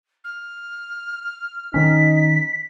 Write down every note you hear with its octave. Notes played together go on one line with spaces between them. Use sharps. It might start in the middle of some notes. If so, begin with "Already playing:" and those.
F6
D#3 C#4 D#4 B6